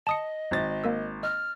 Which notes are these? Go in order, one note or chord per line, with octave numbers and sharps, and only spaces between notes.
D#5 A5 D#6 C#7
G#1 A6
A#3 A#4 E6
D#5 F6